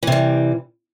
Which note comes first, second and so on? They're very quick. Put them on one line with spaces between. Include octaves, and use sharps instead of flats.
E3 C3 G3